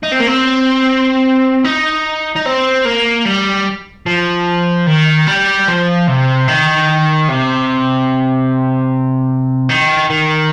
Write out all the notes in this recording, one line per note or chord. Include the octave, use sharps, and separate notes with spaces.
D#4
C4
A#3
C4
D#4
D#4
C4
A#3
G3
F3
D#3
G3
F3
C3
D#3
C3
D#3
D#3